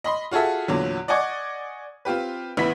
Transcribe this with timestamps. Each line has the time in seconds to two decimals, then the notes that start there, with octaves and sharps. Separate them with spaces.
0.04 D#5 B5 C6
0.31 F4 F#4 G#4 A4 E5
0.68 E2 A#2 D3 F#3
1.08 D5 D#5 F#5 G#5 C#6 D6
2.05 C4 F4 G4 B4
2.57 A1 E3 B3 E4 B5 B6